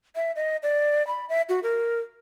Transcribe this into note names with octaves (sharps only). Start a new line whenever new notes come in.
E5
D#5
D5
B5
E5
F#4
A#4